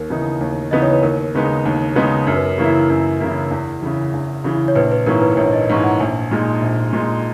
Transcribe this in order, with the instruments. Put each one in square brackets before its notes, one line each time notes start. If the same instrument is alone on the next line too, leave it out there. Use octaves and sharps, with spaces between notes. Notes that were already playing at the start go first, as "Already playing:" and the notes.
Already playing: [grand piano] D#2 [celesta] A#4
[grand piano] C#3 E3 B3 D#4
D#2
[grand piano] C#3 E3 B3 D#4 [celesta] D#5
[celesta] C#5
B4
[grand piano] D#2 [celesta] A#4
[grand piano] C#3 G#3 B3 D#4
D#2
C#3 G#3 B3 D#4
[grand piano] F#2 [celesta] A#4
[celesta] B4
A#4
[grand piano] C#3 E3 A#3 E4
F#2
C#3 E3 A#3 E4
E2
C#3 E3
E2
C#3 E3
[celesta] C#5
[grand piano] A#1 [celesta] B4
[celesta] B4
[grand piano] G#2 E3 A#3 C#4 [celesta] A#4
[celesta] B4
B4
[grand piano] A#1 [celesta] C#5
[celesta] D#5
[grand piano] G#2 E3 A#3 C#4
[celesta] F#5
[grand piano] A#1 [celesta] G#5
[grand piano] A#2 G#3 D#4
A#1
A#2 G#3 D#4